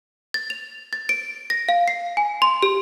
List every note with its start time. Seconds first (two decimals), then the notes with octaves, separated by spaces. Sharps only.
0.34 A6
0.50 F7
0.93 A6
1.09 D7
1.50 A#6
1.69 F5
1.88 C7
2.17 G#5
2.42 C6
2.63 G4